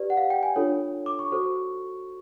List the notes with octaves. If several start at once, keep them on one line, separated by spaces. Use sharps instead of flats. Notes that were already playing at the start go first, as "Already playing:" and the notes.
Already playing: G4 B4 D5
F#5
F5
G5
G#5
D4 F4 A4 C#5
D6
C#6
F#4 A4 C5